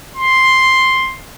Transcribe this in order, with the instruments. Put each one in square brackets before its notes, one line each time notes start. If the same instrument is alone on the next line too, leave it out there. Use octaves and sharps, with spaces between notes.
[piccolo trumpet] C6